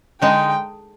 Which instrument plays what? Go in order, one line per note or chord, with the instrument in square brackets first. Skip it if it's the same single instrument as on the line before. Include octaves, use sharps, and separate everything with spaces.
[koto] D3 G#3 D#4 [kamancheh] G5